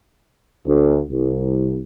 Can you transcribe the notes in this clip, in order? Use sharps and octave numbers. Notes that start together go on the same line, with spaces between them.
D2
C2